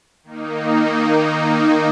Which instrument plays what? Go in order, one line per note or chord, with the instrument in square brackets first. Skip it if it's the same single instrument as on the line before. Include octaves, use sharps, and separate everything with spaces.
[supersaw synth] D#3 A#3 D#4